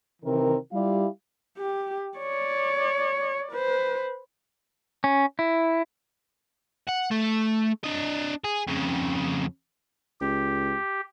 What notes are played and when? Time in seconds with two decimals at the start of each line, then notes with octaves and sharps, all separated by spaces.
0.22 C3 D#3 E3 C4 A#4
0.72 G3 E4 F4 G4 D5 F5
1.58 G4
2.18 C#5 D5
3.52 B4 C5
5.04 C#4
5.39 E4
6.87 F#5
7.11 A3
7.84 D4 D#5
8.45 G#4
8.67 F2 C#3
10.21 C#2 G4